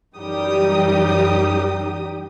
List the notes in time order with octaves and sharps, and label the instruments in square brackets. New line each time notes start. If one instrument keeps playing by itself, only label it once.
[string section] F#2 E3 G3 D#4 G4 D#6